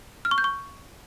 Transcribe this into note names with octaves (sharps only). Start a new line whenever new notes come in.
F6
C#6
G6
C#6